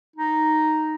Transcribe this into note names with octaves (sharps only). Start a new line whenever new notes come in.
D#4